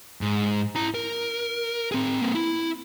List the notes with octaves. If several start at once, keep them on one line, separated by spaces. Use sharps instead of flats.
G#2
E4 A#5
A#4
C4 G#4
A#3 C4
E4